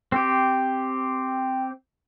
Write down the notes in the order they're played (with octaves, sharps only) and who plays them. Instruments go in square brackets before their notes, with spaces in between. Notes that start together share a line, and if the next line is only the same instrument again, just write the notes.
[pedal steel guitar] C4 G4